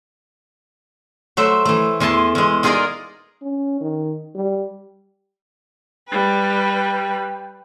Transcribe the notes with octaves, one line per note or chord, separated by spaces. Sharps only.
F#3 A3 C5 E5
E3 A3
E2 E3 G#5 A5 C6
E2 G#3
D#4 F4 G#4 A#4 D5 D#5
C#4
D#3
G3
G3 B4 G5